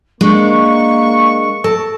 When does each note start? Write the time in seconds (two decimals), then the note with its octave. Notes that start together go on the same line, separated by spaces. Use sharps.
0.21 G#3 A#3 D4 C#6
1.64 A4 A5